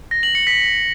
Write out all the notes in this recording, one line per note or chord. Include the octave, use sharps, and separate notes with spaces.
A#6
F#7
C#7
B6